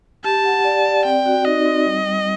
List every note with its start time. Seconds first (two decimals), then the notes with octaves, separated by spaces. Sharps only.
0.24 G4 A5
0.45 F#5
0.64 D5
0.85 D5
1.05 C4 G5
1.26 F#4
1.45 D#4 D#5
1.65 C4
1.86 G3
2.06 G3